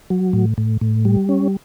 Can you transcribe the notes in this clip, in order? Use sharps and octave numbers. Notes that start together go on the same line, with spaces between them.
F#3
A2
A2
A2
G3
C#4